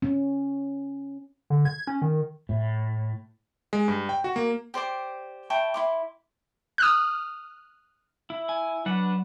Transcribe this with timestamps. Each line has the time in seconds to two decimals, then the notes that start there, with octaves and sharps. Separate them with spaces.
0.02 C#4
1.50 D3
1.65 G#6
1.87 C#4
2.02 D#3
2.49 A2
3.73 G#3
3.88 G2
4.09 G5
4.24 F#4
4.36 A#3
4.74 G4 C5 D5 D6
5.50 E4 G5 A5 C#6
5.74 E4 C6 D6
6.78 D#6 F6 F#6
8.30 E4
8.49 G#5
8.86 F#3 D4 B4 F#5